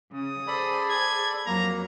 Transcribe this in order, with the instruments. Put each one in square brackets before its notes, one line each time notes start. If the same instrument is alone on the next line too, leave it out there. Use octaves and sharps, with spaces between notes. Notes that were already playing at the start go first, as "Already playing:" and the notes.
[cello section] C#3 [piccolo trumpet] D#6
[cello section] G#4 C5 [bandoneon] A4 D5 B5
[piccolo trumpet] G#6
[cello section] F2 F#3 [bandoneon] A#3 [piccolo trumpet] A#5